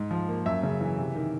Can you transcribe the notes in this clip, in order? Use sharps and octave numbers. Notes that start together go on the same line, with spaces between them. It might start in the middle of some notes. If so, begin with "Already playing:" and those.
Already playing: G#2
F3
A#3
F#2 E5
C#3
E3
C3
D#3